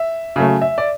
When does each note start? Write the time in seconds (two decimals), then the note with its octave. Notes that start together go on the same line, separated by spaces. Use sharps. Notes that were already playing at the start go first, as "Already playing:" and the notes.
Already playing: E5
0.36 C#3 F#3 A3
0.62 E5
0.78 D5